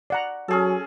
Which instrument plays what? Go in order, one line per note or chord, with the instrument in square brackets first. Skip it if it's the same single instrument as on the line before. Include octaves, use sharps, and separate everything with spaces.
[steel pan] D5 F#5 A#5
[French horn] F#3 [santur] C#4 G#4 A4